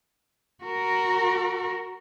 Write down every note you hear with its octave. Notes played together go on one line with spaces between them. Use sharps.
F#4 A#4